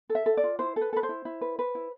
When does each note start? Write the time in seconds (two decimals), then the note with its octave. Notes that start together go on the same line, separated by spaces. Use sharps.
0.09 A4
0.15 E5
0.26 A4
0.37 D5
0.44 F4
0.59 E4 C5
0.76 A4 B4
0.93 A4 B4
1.03 C5
1.09 E4
1.25 E4
1.41 B4
1.59 B4
1.75 E4